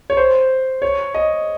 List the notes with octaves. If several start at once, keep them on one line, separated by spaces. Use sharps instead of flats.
C#5
C5
C#5
D#5